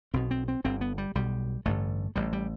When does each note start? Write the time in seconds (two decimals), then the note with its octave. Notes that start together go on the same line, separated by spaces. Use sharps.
0.14 B1 B2 C4
0.31 C4
0.48 C4
0.64 G1 G2 D3 C4
0.81 B3
0.98 G3
1.15 B1 B2 G3
1.65 A1 G2 D3 A3
2.16 A1 A2 G3
2.33 G3